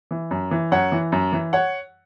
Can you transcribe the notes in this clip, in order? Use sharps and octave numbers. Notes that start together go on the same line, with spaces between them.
E3
F#2
E3
F#2 C#5 F#5
E3
F#2
E3
C#5 F#5